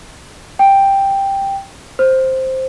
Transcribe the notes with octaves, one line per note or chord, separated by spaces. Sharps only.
G5
C5